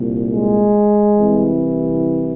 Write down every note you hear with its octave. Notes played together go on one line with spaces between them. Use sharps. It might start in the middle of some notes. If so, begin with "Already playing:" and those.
Already playing: C2 A#2
G#3
C2 C3 E3